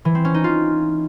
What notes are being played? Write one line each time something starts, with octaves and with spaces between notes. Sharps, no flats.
E3
C4
C#4
D#4
F4